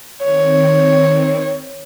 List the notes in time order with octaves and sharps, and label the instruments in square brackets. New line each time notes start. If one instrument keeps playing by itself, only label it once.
[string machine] D#3 C4 [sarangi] C#5